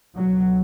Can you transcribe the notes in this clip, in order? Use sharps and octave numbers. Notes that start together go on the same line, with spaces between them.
C#2 B2 F#3